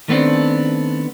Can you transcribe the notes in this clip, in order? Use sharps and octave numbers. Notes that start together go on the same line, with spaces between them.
D#3 A3 B3 C4 D4